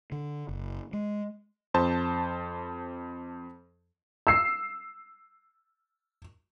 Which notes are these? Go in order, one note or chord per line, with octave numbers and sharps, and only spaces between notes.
D3
F#1
G#3
F2 C5 A5
E6 C7